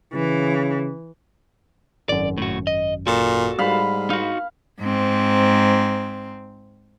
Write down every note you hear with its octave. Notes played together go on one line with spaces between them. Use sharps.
C#3 E3
G#1 F#2 D5
A2 F#4
D#5
A#2 F#4 A4
G#2 G3 F5 B5
D#4 F#4 F5
G#2 C4